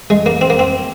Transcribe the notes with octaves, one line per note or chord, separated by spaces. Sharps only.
G#3
A#3
C4
A#3
C4